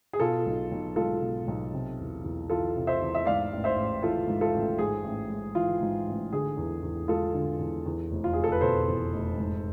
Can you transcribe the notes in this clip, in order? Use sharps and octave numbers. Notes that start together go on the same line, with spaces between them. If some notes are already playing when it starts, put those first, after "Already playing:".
G#4
B2 F4 A4
B1
B1
G#3 F4 A4
B2
B1
C3
E2
E2
E3 F4 A4
C3
C5 E5
E2
E5
G#2 D5 F5
A1
C5 E5
A1
E3 F4 A4
G#2
F4 A4
A1
G#2 G#4
A1
G#3
E3 F4
G#2
A1
D3 G#4
E2
E2
G#3 F4 A4
D3
E2
E2
F1
F4
F1 G#4
A4
B4
B2 A4 C5
E2
F1
G#2